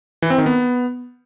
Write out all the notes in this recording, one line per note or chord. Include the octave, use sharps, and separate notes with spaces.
E3
C4
D#3
B3